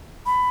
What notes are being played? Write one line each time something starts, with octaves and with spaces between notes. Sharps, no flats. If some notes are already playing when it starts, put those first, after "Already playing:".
B5